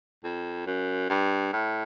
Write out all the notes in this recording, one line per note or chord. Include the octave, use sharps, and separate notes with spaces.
F2
F#2
G2
A2